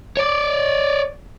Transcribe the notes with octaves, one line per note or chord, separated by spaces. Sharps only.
C#5 D5